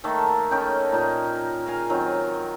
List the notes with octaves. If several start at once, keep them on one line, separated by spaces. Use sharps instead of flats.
D#3 A3 A#3 A4
C#4 D#4 G5
A#2 D#4
A#4 F5 G#5
D#3 F#3 C4 F4